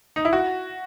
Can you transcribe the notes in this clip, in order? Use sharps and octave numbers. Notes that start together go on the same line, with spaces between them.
D#4
E4
F#4